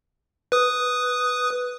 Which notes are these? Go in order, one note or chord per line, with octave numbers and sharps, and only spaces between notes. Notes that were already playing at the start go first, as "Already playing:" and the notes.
B4 D#6